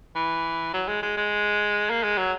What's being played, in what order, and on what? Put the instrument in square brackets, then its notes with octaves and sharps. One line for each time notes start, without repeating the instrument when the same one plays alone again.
[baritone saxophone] E3
F#3
G#3
G#3
G#3
A#3
G#3
F#3